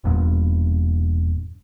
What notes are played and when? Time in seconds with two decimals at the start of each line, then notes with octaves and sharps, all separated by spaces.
0.04 E1 E2 G2 A#2